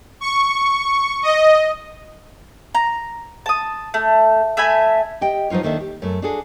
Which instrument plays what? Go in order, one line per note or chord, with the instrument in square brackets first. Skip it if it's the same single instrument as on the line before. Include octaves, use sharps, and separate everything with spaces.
[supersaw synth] C#6
D#5
[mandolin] A#5
A5 D#6
A3
A3 E5 G#5 B5
[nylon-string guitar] G4 D#5 G5
F3 F#3 D#4 F4 C#5
D#2 D#3 A#3 D4 A4 E5
G4
F#2 A3
D4 F#4 G#4 A4